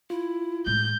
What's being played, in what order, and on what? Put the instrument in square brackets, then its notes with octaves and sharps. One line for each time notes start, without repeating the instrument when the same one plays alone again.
[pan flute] E4 [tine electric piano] F4
[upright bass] A1 G#3 [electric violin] G6